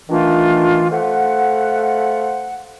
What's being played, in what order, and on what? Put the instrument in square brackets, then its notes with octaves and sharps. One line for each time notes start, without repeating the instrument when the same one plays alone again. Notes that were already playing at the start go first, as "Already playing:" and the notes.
[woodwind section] D#3 E3 A3 D4 F4
A3 C5 F5 F#5